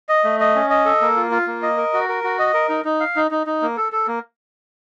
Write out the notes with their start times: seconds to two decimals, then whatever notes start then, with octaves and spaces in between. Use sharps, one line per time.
0.09 D#5
0.24 A3
0.40 D#5
0.55 C#4
0.70 D#5
0.85 A4
1.01 A#3
1.16 F4
1.31 F4
1.47 A#3
1.63 D#5
1.77 A#4
1.94 F#4
2.09 A#4
2.24 F#4
2.39 D#5
2.54 A#4
2.69 D#4
2.85 D#4
3.00 F5
3.16 D#4
3.31 D#4
3.47 D#4
3.62 A#3
3.77 A4
3.92 A4
4.08 A#3